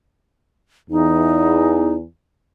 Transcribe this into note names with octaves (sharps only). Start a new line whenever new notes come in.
E2 D#4